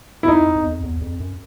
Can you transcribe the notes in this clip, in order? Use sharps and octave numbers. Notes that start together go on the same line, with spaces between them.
E4
F2 D#4
F2
E2
F2
E2
F2
F#2